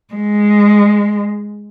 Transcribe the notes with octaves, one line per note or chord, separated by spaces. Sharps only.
G#3